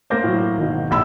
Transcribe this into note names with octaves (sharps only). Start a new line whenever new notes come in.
A#3 C5 D6 G6 A#6
A2 F#3
G#1 G#2 B2
A#1 B5 E6